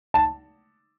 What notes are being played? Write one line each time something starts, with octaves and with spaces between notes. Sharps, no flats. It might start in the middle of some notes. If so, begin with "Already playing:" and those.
A5